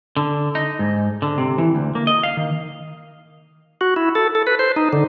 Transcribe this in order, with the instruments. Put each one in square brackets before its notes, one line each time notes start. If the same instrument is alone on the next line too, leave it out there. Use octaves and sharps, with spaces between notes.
[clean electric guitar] D3
D#4
G#2
D3
C3
E3
D2
A#3
D#5
F5
D#3
[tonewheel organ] F#4
E4
A4
A4
B4
C5
D#4
D3